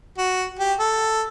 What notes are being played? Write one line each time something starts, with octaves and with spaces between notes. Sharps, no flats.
F#4
G4
A4